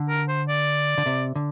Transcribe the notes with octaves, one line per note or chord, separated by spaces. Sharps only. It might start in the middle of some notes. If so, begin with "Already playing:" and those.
Already playing: D3
A#4
C5
D5
D3
C3
D3